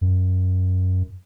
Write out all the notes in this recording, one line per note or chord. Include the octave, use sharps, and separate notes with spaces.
F#2